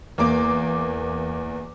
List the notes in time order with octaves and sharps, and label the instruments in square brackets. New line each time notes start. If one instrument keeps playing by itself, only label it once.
[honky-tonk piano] E2 A#3 D6